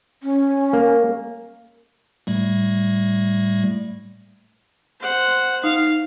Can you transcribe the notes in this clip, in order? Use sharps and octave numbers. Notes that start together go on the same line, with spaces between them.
C#4
A#3
A2 G3 A3
C5 F#5
D#4 F5